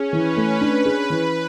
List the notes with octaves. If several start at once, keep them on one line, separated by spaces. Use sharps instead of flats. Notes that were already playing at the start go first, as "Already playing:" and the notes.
Already playing: C#4 G#4
E3 B4
A3
D4 B4
G#4
E3 B4